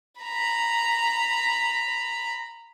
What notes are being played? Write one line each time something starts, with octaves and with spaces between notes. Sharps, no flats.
A#5 B5